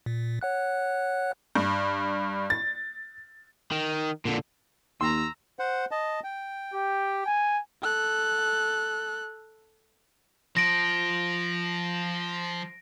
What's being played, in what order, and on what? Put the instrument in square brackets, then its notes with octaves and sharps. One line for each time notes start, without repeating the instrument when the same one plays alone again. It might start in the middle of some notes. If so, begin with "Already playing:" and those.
[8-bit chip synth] A#2
C#5 F#5 F#6
[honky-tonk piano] G2
A6
[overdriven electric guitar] D#3
A#2 D3
[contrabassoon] D#2 [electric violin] A#5 E6 [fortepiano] C6
[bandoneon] C5 F#5
D#5 A5
G5
[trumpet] G4
G#5
[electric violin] A4 F#6
[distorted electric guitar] F3 [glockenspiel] A#6 D7